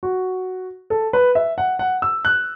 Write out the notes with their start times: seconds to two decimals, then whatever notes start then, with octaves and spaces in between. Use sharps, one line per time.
0.03 F#4
0.90 A4
1.13 B4
1.35 E5
1.58 F#5
1.79 F#5
2.02 E6
2.25 F#6